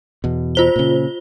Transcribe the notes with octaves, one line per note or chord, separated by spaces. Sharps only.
E2 B2
F4 C5 G7
A#2 C#3